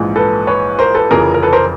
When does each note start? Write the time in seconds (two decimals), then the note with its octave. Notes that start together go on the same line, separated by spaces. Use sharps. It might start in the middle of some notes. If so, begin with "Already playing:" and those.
Already playing: A#1 G#2 E3
0.16 A4 B4
0.47 B4 C#5
0.79 A#4 C5
0.95 A4 B4
1.11 F1 F2 C#3 E3 G#4 A#4
1.34 A#4
1.43 A4 B4
1.53 A#4 C5